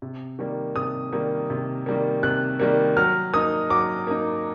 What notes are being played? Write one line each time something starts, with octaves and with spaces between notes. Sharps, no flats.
C3
D#3 G3 A#3
C3 D#6
D#3 G3 A#3
C3
D#3 G3 A#3
C3 F#6
D#3 G3 A#3
F#3 F6
A#3 D#4 D#6
F#3 D6
A#3 D#4